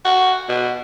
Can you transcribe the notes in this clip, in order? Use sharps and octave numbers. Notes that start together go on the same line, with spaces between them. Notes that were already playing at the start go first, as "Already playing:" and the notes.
F#4
B2